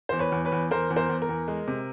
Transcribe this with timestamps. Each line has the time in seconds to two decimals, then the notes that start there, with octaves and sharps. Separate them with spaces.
0.09 E2 C5
0.19 B4 C#5
0.32 E2
0.45 B4 C#5
0.52 E2
0.71 E2 A#4 C5
0.91 E2
0.96 A#4 C5
1.10 E2
1.22 A#4
1.29 E2
1.48 G#3
1.68 C3